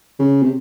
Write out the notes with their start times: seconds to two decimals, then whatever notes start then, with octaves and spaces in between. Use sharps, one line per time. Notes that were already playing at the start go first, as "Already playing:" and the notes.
0.19 C#3
0.42 C3